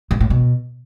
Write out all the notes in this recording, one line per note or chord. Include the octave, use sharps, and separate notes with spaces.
G2
A2
B2